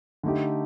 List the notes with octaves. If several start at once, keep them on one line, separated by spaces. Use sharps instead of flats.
D3 A3 D#4 G4